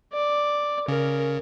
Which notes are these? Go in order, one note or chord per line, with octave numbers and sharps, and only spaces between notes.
D5
C#3 A#4